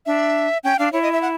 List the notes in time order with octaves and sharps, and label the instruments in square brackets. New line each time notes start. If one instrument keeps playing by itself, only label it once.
[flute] D4 [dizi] E5
[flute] C#4 [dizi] G5
[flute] D4 [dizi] F5
[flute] E4 [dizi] C#5
[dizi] D#5
E5
F#5